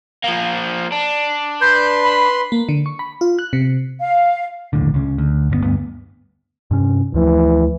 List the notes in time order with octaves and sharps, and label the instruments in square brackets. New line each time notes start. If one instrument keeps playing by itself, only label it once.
[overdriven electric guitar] F3 A#3
D4
[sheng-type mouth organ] B4 C6 [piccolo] G6
[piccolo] B5
[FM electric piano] A#3
D3
C#6
B5
F4
F#6
C3
[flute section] F5
[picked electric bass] A#1 D#2 A2 D3
C#2 C#3
D2
G1 D3 B3
D2 G2 B3
G2 C3 C#4
[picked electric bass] D2 F3 A3 [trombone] E3